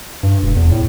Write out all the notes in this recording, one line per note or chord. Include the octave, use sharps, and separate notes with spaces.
G2
E1
E2
A2